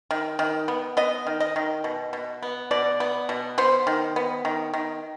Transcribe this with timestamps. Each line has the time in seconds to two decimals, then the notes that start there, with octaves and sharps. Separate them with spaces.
0.11 D#3
0.39 D#3
0.68 B3
0.97 B3 D#5
1.27 D#3
1.40 D#5
1.56 D#3
1.84 B2
2.13 B2
2.43 B3
2.71 B2 D5
3.00 B3
3.29 B2
3.58 B3 C5
3.87 D#3
4.16 B3
4.45 D#3
4.74 D#3